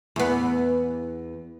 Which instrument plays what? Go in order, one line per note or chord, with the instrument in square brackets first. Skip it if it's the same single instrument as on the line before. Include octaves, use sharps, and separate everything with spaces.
[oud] E2 B3